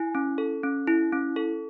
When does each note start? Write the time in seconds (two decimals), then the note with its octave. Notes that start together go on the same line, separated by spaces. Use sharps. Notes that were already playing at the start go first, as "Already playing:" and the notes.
Already playing: E4 G#5
0.15 C#4
0.38 A4
0.63 C#4
0.87 E4
1.13 C#4
1.36 A4